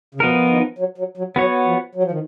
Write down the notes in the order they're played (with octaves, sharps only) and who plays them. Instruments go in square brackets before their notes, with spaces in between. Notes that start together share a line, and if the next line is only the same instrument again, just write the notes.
[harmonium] C#3
[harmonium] B2 [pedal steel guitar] F3 B3 D#4 A#4
[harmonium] D#3
F#3
F#3
F#3
[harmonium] F#3 [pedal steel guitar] B3 F#4 C#5
[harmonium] F3
F#3
F3
D#3